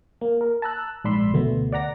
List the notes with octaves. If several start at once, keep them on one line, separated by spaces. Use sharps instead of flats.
A#3
A#4
A5 A#5 E6 F#6
A#1 G#2 D5 B5 C6 E6
D2 B2 A3 B3
D5 F#5 A#5 A#6